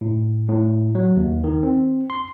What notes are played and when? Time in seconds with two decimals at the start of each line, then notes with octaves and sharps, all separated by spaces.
0.01 A2
0.49 A2
0.95 F#3
1.17 D#2
1.44 D#3
1.63 C4
2.10 C6